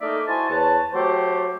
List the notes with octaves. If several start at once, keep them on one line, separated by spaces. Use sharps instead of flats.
A3 A#3 D#4 D5 E5
E4 F#4 C5 G#5 A5
E2 B4 C#5 A5
F#3 A3 G4 C5